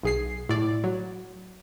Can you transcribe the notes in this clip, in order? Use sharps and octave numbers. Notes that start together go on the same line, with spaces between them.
B1 G#4 C7
A2 D5
F#3